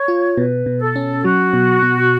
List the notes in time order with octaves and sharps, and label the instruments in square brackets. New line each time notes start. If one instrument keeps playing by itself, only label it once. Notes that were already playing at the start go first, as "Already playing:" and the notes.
Already playing: [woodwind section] C#5
[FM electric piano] F4
[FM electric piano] B2 [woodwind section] B4
[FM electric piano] B2
[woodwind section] A4
[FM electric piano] C#4
[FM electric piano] F#3 [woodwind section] F#4
[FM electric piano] B2
B2